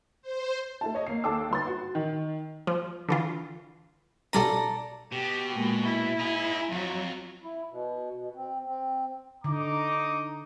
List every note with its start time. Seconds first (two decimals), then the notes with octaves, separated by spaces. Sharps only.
0.22 C5
0.81 A3 E4 A5
0.94 C#5 D#5
1.07 A#3 C7
1.24 D#2 A4 G5 A5 D6 E6
1.51 G1 C6 A6
1.67 F#4
1.95 D#3
2.67 F3
3.09 D3 E3 F4
4.33 B1 G3 A4 D5 A#5 D#7
5.12 B2 G4
5.55 A#2 G#3
5.87 E4
6.19 D#4 G#4
6.72 F2 F#3
7.43 E4
7.71 B2
8.17 B2
8.36 C4
8.66 C4
9.44 D3 D#4 A#5 D6